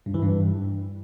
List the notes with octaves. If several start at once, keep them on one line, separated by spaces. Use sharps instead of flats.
G2
E3
G2